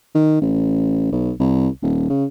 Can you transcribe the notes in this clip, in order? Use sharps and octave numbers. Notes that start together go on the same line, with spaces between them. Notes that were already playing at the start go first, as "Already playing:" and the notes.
D#3
A1
B1
C2
D#1
C#3